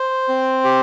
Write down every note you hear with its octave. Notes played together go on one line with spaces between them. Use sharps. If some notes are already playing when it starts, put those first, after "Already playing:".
Already playing: C5
C4
G4